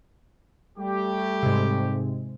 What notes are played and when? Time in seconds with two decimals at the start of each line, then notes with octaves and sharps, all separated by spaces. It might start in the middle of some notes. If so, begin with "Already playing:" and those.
0.78 G3 A3 G4
1.43 G#2 C3